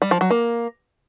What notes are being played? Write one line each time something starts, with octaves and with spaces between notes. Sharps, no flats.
G3
F3
F#3
A#3